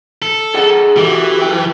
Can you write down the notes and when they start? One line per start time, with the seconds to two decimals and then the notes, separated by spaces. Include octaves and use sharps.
0.22 A4
0.54 G#4 D#5 F#5
0.97 E3 F#4 G4 A4
1.42 F#2 G5